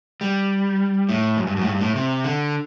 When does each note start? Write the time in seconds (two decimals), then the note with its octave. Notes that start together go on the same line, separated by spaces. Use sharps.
0.21 G3
1.09 A2
1.37 F#2
1.47 G2
1.57 F#2
1.62 A2
1.66 G2
1.81 A2
1.95 C3
2.24 D3